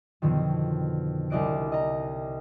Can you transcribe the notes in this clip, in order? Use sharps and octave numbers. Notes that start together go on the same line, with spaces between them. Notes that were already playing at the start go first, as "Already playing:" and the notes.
F2 B2 D3 D#3
C2 D4 D5 D#5 F#6 D7
D#5 A#5